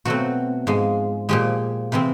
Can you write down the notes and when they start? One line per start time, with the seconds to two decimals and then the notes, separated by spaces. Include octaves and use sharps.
0.05 B2 F#3 A3 C4 F#4
0.67 G#2 F3 G#3
1.29 A#2 F3 G#3 G4
1.92 C3 E3 G#3 C4